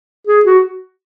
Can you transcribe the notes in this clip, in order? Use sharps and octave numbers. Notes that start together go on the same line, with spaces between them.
G#4
F#4